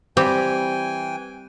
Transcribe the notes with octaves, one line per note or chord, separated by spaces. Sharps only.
E3 G3 C4 G4 G5 G#5